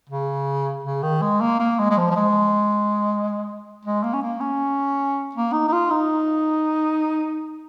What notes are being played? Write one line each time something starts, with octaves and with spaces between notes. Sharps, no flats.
C#3
C#3
D#3
G#3
A#3
A#3
G#3
G#3
F3
F3
G#3
G#3
A#3
C#4
A#3
C#4
A#3
D#4
D#4
F4
D#4